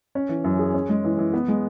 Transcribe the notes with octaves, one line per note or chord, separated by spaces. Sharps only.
C#4
E3
F#2
G#4
C#4
G#3
E3
E3
B3
G#3